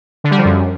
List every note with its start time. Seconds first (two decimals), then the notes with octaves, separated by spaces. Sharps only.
0.24 D3
0.31 G3
0.38 F3
0.45 F#2